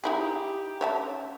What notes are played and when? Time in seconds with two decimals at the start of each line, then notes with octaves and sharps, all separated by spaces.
0.04 D#4 E4 G4 G#4
0.81 C#4 C#5 E5 A5